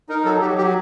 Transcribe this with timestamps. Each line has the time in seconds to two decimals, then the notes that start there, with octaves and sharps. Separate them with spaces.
0.09 D#4 A#4
0.25 F#3 A4
0.41 F#3 G4
0.57 F#3 G4